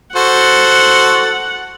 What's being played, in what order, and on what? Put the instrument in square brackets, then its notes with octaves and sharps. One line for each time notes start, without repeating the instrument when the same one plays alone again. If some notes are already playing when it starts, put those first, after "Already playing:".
[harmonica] F#4 A4 C5 [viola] F#5